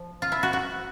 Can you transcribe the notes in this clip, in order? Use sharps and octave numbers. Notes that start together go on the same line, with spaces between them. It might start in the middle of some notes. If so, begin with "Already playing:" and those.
Already playing: F3
F4
E4
F#4
F#4